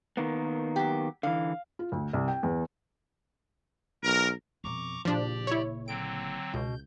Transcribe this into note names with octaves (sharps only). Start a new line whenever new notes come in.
D#3 A#3 B3
F#3 G4
D3 E3 F5
F4
D2
C2
G5
E2
B1 A#4
F2 B2 A#5 C#6 D6
F#1 A#2 F3 D4 G4 D5
E4 C#5
D3 F#3 C4 D7
C#2 B2 G6